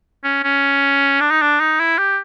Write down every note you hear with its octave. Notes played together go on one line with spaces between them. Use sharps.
C#4
C#4
D4
D#4
D4
D#4
E4
G4